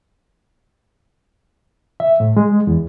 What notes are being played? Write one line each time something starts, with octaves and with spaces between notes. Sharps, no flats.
E5
A2
G#3
E2